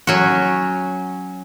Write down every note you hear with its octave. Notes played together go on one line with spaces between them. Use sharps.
F#3 C#4 F#4